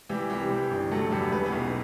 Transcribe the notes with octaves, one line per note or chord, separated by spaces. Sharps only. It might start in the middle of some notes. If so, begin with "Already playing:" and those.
E3 G3 G4
C2 G3 G4
E3
G1
F#3 A3 A4
E2 G3 G4
E3 B3 B4
B3 B4
B1